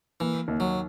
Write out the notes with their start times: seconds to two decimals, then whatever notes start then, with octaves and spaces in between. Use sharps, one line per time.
0.20 E3 A#3
0.48 D#2
0.60 F#3